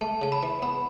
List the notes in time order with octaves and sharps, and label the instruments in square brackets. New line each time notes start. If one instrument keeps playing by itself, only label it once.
[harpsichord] A3 [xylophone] A5
[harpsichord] C#3 [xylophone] A5
[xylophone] B5
[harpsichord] E3
[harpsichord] B3 [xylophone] B5